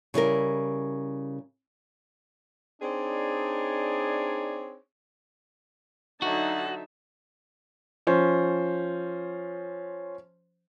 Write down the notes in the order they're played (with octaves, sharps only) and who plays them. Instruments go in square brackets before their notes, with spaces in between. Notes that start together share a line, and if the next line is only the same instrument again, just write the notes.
[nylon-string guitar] C#3 G3 E4 A#4
[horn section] C4 D4 D#4 G#4 C#5 D5
[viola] D3 A5 [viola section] F#3 D#4 E5 [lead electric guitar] F#4
[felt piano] F3 C#4 C5